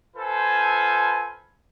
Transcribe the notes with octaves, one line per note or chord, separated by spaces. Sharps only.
F4 A4 B4 C5 G#5 A5